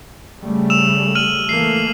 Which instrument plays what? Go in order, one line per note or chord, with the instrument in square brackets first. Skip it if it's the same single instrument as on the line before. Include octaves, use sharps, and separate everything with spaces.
[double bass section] C#3 G3 A3
[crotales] E6 E7 F7
F6 D#7 F#7
[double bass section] E3 A3 A#3 [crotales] C7